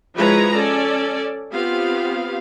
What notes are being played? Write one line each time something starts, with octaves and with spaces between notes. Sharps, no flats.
F3 G#3 E4 B4 C#5 A#5
C#4 A4 D5
B3 C4 F4 G4 F5